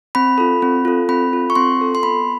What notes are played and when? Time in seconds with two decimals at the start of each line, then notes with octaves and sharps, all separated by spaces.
0.15 C4 B5
0.38 F4 A4
0.62 C4
0.85 F4 A4
1.09 C4 B5
1.33 F4 A4
1.50 C#6
1.55 C4 C6
1.79 F4 A4
1.95 C6
2.03 B3 B5